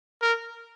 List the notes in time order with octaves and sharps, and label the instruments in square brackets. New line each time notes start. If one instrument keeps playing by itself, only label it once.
[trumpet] A#4